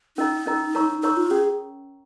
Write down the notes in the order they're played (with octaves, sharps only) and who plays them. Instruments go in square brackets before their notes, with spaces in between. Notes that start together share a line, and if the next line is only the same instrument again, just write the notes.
[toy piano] C#4 A#4 D#5 A#5 [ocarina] D#4
[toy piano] C#4 A#4 D#5 A#5
A#4 C#5 A#5 C#6
[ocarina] D#4 [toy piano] A#4 C#5 A#5 C#6
[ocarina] F4
[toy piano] C#4 [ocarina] G#4